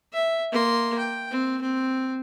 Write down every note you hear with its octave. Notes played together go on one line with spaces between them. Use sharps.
E5
A#3 C6
G5
C4
C4